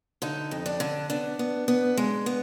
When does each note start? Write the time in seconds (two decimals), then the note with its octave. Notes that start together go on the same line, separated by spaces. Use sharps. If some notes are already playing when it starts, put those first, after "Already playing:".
0.22 D3 D#4
0.51 F2
0.66 D4
0.80 D3
1.10 B3 D4
1.39 B3
1.68 B3
1.97 G#3
2.26 B3